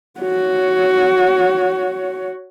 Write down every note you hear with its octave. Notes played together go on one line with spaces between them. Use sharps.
F#4 C#5